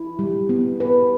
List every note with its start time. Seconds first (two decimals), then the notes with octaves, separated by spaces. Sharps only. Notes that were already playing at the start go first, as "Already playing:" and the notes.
Already playing: E4
0.19 G3
0.49 B3
0.80 B4